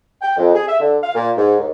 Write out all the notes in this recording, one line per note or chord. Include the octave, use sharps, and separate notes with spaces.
G5
F2
G#4
E5
D3
F5
A#2
G#2
D#2